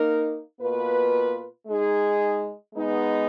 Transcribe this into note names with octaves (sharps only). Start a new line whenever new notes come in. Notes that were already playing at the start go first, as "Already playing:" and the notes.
Already playing: A#3 D#4 A#4
B2 A#3 F4 B4
G#3 D#4 G#4
G#3 B3 D#4